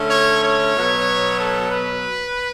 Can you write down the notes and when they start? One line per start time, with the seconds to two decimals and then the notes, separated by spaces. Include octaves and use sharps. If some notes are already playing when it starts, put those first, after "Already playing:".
Already playing: D3 A3 C#4
0.10 C#5
0.43 C#5
0.75 B2 F#3 B3
1.40 A4
1.71 B4